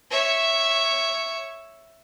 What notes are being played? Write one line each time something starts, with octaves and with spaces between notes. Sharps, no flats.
C#5 E5